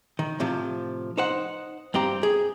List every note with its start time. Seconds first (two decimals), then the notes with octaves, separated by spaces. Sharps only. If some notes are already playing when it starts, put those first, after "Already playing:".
0.19 D#3
0.40 A2 C3 F3
1.18 D#4 C5 F#5
1.94 G2 C4 G4 A#5
2.23 G#4